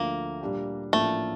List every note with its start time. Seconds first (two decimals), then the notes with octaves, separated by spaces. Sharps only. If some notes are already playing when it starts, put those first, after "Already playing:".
Already playing: D2 D3 F3 A#3
0.41 A#2 G3 D4 G4
0.93 A1 A2 F3 A3 A#3 D4